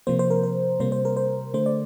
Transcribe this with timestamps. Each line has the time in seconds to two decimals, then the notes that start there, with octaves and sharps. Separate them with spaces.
0.07 C3 F3 A#3 C5
0.19 C5
0.30 A#4
0.43 A#4
0.80 C3 G3 A#3 C5
0.92 C5
1.05 A#4
1.17 C5
1.54 D3 A3 C5
1.66 D5